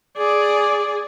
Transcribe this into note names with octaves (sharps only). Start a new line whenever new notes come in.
G#4 D5